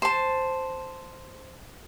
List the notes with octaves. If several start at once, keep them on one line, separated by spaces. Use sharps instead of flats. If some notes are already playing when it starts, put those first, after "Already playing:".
C5 A5